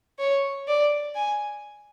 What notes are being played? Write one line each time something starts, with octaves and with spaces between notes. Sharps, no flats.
C#5
D5
G#5